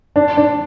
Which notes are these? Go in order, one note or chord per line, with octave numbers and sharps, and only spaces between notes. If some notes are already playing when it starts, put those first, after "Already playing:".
D4
D4